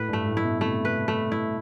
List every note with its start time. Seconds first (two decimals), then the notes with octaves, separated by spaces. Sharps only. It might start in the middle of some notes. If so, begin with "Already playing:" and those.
Already playing: A2 B4
0.08 G2
0.13 A3
0.26 A2
0.37 E4
0.44 B2
0.61 C3 A3
0.85 B4
1.08 A3
1.32 E4